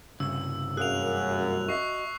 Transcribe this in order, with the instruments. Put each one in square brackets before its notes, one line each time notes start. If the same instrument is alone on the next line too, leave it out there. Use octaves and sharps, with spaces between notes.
[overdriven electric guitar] C2 G2 [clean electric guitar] C#3 [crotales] E6
[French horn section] F#2 [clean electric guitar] G#4 A#4 F5 [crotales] F#6 F7
[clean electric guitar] F#4 D#5 E5 [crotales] C#6 C7